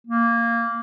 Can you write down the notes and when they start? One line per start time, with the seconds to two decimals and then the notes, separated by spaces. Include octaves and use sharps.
0.07 A#3